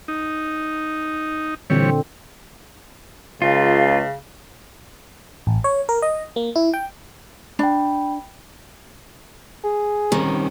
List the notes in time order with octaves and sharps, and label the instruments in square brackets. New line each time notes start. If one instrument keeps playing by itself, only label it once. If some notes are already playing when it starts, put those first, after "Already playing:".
[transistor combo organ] D#4
[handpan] A#2 D3 C4 [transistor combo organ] E3 G3 C#5
[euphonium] C#2 [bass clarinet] C#3 [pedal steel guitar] F4
[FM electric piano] A1
C#5
A#4
D#5
A#3
E4
G5
[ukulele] D4 [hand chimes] G5 B5
[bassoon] G#4
[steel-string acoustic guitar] D#3 [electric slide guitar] G3 C4 C#4